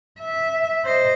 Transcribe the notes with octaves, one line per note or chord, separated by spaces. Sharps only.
E5
C5 D#5